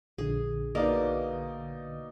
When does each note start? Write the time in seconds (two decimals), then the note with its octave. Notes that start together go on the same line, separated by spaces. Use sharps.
0.18 A#1 D3 G#4
0.75 B2 A#3 D#4 D5 D#5